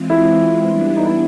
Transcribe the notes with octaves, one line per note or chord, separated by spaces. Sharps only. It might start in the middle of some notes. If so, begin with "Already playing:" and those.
Already playing: E3 G#3 C4 F4
E4
E3 G3 B3 D4
D#4
E4